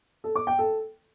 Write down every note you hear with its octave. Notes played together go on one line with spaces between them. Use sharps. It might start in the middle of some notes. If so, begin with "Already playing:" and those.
A4
D6
G5
A4